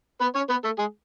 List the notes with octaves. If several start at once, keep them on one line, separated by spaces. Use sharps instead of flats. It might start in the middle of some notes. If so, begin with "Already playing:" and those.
B3 B4
C#4 C#5
B3 B4
A3 A4
G#3 G#4